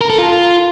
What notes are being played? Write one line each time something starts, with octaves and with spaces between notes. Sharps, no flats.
A#4
A4
F4